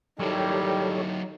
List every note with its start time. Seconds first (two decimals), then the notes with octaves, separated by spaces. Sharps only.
0.19 D#3 F#3 G3 E4 G4 A4 C#5